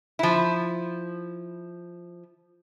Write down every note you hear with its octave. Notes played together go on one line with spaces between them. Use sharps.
F3 E4